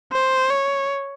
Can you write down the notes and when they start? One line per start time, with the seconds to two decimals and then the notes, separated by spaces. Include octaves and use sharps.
0.13 C5
0.50 C#5